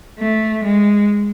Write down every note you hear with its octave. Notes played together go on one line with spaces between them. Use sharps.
A3
G#3